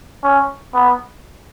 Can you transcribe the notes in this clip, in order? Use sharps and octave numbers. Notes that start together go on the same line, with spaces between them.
C#4
B3